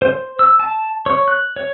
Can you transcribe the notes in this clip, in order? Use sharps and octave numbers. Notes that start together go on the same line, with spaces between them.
C5
E6
A5
C#5
F#6
C#5